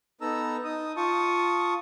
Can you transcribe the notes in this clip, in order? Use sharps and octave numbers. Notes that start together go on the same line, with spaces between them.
B3 D#4 A4 A#5 E6
D#4 D#6
F4 A5 C#6 D#6